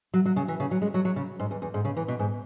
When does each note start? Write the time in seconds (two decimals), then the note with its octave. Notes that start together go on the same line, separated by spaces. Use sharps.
0.14 F#3
0.26 F#3
0.36 C#3
0.48 E3
0.60 C#3
0.71 F#3
0.82 G#3
0.94 F#3
1.05 F#3
1.16 C#3
1.40 G#2
1.51 E2
1.62 E2
1.74 G#2
1.85 C#3
1.97 E3
2.08 B2
2.19 G#2